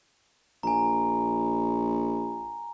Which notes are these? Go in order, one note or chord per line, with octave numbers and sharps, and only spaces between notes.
A#1 G#5 A#5